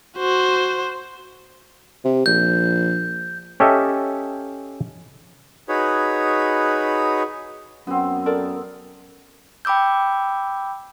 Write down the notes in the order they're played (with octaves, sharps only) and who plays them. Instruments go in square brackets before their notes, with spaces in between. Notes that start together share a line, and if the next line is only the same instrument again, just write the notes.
[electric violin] F#4 C5
[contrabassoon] C3
[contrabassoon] A#1 [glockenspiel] G6
[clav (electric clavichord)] C#4 G4 A4 D#5 E5
[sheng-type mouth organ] D#4 F#4 G#4 B4 C#5 B5
[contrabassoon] F#2 [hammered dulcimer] B3 C4
[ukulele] A4 A#4 D5
[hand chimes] G5 B5 D6 E6 G6